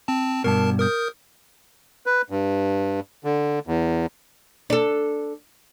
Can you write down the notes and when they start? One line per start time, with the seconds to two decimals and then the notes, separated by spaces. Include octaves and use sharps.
0.08 C4 A5
0.44 G2 B2 A#4 A5
0.80 A#4 D#6 G6
2.06 B4
2.30 G2
3.24 D3
3.67 E2
4.70 D4 A4